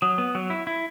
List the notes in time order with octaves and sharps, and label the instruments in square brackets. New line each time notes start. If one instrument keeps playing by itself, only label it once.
[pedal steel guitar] F#3 [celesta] D#6
[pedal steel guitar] B3
F#3
E4
E4